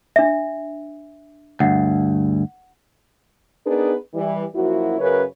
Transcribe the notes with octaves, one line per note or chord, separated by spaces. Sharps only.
D4 E5
D2 G2 F#5
B3 D4 D#4 G#4 A#4 B4
E3 G3
F#2 F3 A#3 E4 F#4
F#2 C#3 A#4 B4 C#5